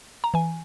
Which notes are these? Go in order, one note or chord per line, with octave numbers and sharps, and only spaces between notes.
A#5
E3 G#5